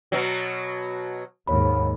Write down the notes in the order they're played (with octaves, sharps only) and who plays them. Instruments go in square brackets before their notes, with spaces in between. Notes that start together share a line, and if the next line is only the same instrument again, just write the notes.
[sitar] B2 F#3
[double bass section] D#2 G#2 [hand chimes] C#5 B5